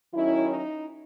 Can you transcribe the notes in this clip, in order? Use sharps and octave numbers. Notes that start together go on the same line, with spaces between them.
D#3 F#3 C#4 E4
D#4